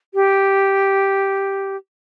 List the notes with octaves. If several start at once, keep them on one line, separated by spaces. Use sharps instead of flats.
G4